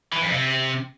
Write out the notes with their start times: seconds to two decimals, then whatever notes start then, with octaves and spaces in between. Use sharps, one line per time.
0.12 E3
0.22 F2
0.31 C3